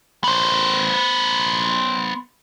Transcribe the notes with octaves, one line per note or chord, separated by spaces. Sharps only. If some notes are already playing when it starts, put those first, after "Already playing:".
B3 C5